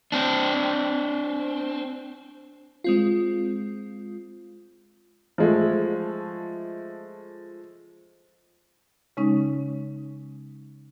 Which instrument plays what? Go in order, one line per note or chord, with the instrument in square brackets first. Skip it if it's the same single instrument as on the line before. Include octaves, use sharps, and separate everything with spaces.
[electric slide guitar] C4 D4
[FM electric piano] G#3 C4 F4
[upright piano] F3 G#3 A3
[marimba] C#3 G#3 C#4 D#4